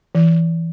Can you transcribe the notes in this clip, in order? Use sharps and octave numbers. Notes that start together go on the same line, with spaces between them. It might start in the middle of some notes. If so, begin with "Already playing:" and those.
E3